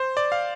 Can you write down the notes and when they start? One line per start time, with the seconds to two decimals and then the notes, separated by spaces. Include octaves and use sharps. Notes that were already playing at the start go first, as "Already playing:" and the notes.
Already playing: C5
0.17 D5
0.32 F5